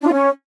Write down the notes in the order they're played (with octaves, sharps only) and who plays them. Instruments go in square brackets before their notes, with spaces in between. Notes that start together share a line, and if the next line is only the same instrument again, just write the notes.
[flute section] D4
F4
C#4